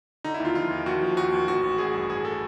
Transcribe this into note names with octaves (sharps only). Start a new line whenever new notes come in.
D3 D#4
E4
D#2 F4
F3 F4
D#2
D#2 F#4
F3
D#2 F#4
D#2
A1 F#4
A1
A1 G#4
G2
A1 G#4
A4